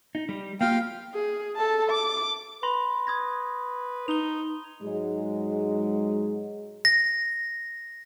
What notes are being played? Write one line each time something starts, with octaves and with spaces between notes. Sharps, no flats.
D#4
G3
A#3 F4 G4 F5 G5
G#4
A4 A5
D6
B4 B5 C6 A#6
D#6 G#6 A#6
D#4 F7 G7
G#2 F#3 G#3
A#6